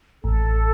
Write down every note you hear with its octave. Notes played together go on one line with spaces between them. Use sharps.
A1 A4